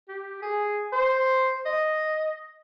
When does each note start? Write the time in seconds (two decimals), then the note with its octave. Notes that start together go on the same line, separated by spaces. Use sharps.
0.08 G4
0.42 G#4
0.92 C5
1.65 D#5